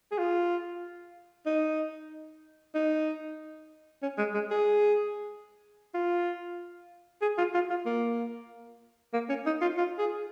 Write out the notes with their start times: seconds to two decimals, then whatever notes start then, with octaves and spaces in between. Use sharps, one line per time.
0.12 G#4
0.18 F4
1.46 D#4
2.75 D#4
4.03 C#4
4.18 G#3
4.34 G#3
4.51 G#4
5.94 F4
7.22 G#4
7.38 F4
7.54 F4
7.70 F4
7.86 A#3
9.13 A#3
9.29 C#4
9.46 D#4
9.62 F4
9.77 F4
9.99 G#4